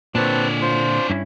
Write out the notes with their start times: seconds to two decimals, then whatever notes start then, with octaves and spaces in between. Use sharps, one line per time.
0.15 A#2 D3 C4 D4 B4 C#5 A5
0.62 F4 C5 C6
1.10 G2 C#4 E4